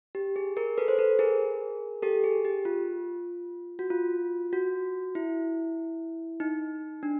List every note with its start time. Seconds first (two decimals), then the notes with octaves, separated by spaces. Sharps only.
0.15 G4
0.36 G#4
0.57 G#4 A#4
0.78 A4 B4
0.88 C5
0.99 A4 B4
1.19 G#4 A#4
2.02 G4 A4
2.24 G#4
2.45 G4
2.65 F4
3.79 F#4
3.90 F4
4.53 F#4
5.15 E4
6.40 D#4
7.03 D4